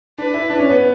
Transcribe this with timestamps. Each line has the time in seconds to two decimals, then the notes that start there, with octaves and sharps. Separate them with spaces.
0.18 D4 B4
0.34 E4
0.50 D4
0.59 C#4
0.70 B3